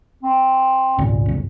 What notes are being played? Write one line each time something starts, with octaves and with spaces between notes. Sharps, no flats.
C4
G#1 C#2 A#2
G1 C#2